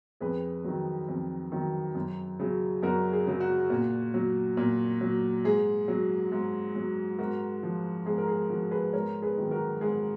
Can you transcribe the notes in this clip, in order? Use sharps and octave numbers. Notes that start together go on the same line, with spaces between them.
F2 G#4 B4
D#3 F#3
F2
D#3 F#3
F#2
C#3 F#3
F#2 F#4 A#4
G#4
C#3 F#3
F#4
A#2
F#3
A#2
F#3
G#2 G#4
F#3
G#2
F#3
G#2 F#4 A#4
F3
G#2 G#4
A#4
G#4
F3 F#4 A#4
G#4 B4
G#2 A#4 C#5
G#4 B4
D#3 F#3
F#4 A#4
G#2 G#4